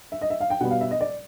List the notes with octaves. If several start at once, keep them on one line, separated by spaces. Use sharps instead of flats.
E5
D#5
E5
F5
G5
B2 G3 B3 F#5
F5
E5
D#5
D5